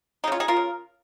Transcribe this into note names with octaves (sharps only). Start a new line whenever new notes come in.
G#3 D#4
C#3 C#4 F4
D#4 G#4
F4 A#4
C#3